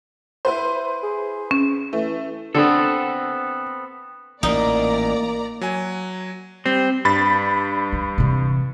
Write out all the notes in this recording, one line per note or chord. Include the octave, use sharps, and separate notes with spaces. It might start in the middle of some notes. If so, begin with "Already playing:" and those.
E4 B4 C5
G#4
C#4
E3 A3
D3 B3 C4 A4
A1 A#2 A#3 D#4 D5 A#5
F#3 G#5
G3 C4
G2 B5 A6
E3
C3 E3